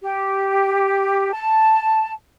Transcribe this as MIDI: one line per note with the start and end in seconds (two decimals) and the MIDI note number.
0.04 1.30 67
1.32 2.11 81